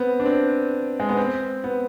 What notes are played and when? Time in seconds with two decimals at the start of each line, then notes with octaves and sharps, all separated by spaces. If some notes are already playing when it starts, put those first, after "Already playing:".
Already playing: B3 C4
0.20 D4
0.25 C4
1.00 G#3
1.09 B3
1.17 C4
1.64 B3